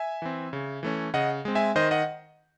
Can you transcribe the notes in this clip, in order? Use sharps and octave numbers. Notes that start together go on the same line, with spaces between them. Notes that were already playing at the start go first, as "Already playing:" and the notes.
Already playing: E5 G#5
E3 C4
C#3
E3 A3 C#4
C#3 D#5 F#5
G#3 C4
E5 G#5
D#3 C5 D#5
D#5 F#5